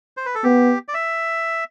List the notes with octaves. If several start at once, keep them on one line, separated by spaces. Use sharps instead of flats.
C5
B4
A4
B3 G4
D5
E5